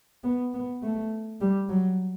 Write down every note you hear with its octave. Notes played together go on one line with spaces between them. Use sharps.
B3
B3
A3
G3
F#3